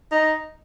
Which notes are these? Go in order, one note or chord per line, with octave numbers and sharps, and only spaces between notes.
D#4